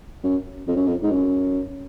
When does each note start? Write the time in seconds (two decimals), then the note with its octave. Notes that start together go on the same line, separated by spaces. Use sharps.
0.23 F#2
0.67 F2
0.76 F#2
0.87 F2
1.03 G#2
1.10 F#2